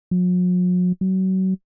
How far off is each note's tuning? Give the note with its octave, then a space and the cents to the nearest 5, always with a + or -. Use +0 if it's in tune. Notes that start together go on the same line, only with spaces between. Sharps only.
F#3 -45
F#3 +30